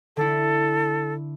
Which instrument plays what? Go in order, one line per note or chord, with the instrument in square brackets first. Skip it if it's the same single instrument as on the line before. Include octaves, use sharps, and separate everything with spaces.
[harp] D3 E4 [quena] A4